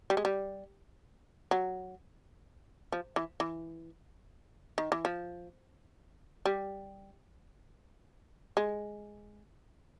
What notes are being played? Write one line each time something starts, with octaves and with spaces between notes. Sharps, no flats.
G3
G#3
G3
F#3
F3
E3
E3
D#3
E3
F3
G3
G#3